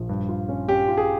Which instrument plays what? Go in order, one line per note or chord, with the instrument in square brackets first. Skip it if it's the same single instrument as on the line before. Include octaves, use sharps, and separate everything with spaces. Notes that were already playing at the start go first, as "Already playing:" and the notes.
Already playing: [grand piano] A#1 F3
G2
F4
C#4
C#4 G4
F4
G#4